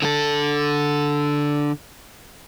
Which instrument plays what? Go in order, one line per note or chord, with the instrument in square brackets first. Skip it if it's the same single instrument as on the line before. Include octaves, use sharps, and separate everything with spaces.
[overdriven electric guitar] D3 A4